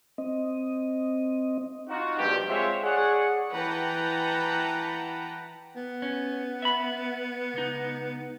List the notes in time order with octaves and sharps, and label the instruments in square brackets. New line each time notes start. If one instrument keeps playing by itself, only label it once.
[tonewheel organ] C4 D#5
[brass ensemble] D#4 F4 F#4
A#1 G2 B2 F4 G4
G#3 C4 F4 C5 C#5 E5
G#4 C#5 D5 F#5
[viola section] E3 B4 F#5 G5 A5 A#5
[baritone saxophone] B3
[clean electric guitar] C#4
E5 B5
C#2 D#4